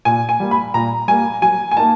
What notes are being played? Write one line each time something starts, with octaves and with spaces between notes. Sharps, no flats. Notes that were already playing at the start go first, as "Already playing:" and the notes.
A#2 G#5
G#5
G3 A#3
B5
A#2 A#5
G3 A#3 G#5
F#3 G#5
G#5
A#3 D#4 A5